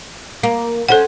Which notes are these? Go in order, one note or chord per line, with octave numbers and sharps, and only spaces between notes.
A#3
C#4 A4 C5 F#5